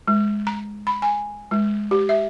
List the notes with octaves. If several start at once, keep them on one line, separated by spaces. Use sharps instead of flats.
G#3
A#5
B5
G#5
G#3
G4
E5